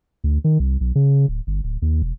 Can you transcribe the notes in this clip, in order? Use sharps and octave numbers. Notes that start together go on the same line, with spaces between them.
D2
D#3
C2
B1
C#3
D1
G1
D1
D#2
E1